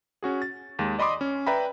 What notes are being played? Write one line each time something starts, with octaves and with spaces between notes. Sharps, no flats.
C#4 F#4 G#4
A6
D#2 G#3
D5 D#5 B5 C6 D6 D#6
C#4
B4 D5 E5 G5 A#5 B5